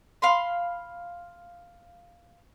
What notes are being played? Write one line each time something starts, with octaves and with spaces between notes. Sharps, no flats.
F5 B5 C6